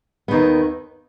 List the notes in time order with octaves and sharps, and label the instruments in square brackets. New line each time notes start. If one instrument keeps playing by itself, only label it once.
[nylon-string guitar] D#2 D#3 B3